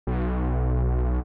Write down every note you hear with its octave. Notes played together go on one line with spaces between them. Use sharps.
B1